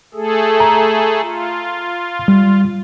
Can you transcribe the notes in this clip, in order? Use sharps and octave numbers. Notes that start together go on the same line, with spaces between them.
A3 G#4 A4
A#5
F4
G3